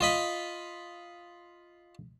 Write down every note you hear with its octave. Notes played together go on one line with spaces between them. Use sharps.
F4 D#5 B5